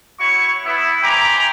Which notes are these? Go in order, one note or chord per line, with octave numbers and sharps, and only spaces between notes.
E4 F#4 C#5 C#6
B3 E4
C5 G5 G#5 A#5 B5 D6